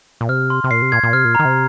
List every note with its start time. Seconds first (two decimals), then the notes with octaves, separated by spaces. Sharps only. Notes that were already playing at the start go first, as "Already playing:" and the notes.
0.21 A#2
0.29 C3 F6
0.50 C6
0.64 C3
0.71 A#2 C7
0.82 C3
0.92 A#2 G#6
1.03 A#2
1.13 C3 F6
1.25 A#2
1.35 D#3 A#5
1.45 C3